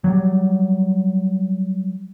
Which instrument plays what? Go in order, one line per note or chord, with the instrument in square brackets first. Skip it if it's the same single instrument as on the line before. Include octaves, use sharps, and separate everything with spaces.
[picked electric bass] F#3 G3